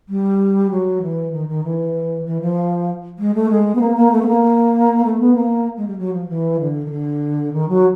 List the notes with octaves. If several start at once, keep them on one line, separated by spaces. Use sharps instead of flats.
G3
F#3
E3
D#3
D#3
E3
E3
F3
G#3
A3
G#3
B3
A#3
A#3
A3
B3
A#3
A3
B3
A#3
G#3
G3
F#3
F3
E3
D3
D#3
D3
D#3
F#3